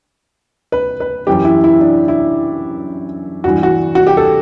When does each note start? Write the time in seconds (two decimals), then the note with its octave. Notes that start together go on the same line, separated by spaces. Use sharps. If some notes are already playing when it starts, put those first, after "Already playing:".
0.72 B4
1.00 B4
1.27 F#2 E3 G4
1.45 E4
1.64 E4
1.81 D4
2.08 E4
3.44 G2 E3 F#4
3.63 F#4
3.95 F#4
4.07 G4
4.17 A4